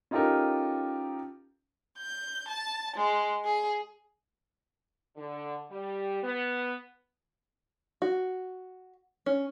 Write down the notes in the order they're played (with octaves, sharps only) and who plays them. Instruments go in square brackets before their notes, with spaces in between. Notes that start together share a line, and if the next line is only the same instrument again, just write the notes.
[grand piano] C#4 D#4 F4 G4 A4 A#4
[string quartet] G6
A5
G#3
G#4
[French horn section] D3
G3
B3
[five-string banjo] F#4
C#4